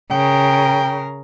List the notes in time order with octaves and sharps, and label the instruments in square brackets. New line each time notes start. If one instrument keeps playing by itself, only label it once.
[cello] C#3 A#4 [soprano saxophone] G5